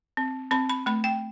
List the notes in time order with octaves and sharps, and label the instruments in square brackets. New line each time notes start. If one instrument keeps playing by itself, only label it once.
[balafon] C4
C4 B5
B5
A3 B5
G5